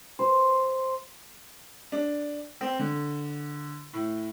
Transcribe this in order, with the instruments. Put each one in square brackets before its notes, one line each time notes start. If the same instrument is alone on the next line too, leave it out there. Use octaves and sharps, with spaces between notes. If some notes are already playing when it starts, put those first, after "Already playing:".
[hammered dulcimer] C5
[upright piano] D4
C4
D3
A2